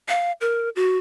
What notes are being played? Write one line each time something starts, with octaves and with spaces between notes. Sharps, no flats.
F5
A#4
F#4